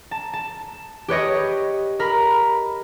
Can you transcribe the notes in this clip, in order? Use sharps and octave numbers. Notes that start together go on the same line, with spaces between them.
A5
A5
G4 B4 C#5 D#5
A#4 B5